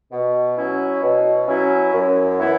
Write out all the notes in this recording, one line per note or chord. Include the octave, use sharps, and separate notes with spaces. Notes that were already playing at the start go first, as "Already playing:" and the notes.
B2
F#3 C#4 E4
B2
F#3 C#4 E4
F#2
E3 B3 E4